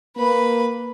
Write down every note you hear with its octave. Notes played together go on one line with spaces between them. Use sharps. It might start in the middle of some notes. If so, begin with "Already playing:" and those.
A#3 B4 B5